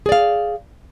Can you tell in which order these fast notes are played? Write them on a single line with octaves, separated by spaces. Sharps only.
G#4 D5 F5